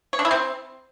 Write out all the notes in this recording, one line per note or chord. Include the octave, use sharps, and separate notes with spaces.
C#5
D4
E4
C4